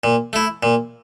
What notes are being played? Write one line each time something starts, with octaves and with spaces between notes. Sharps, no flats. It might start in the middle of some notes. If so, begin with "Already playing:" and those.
A#2
A3 E4
A#2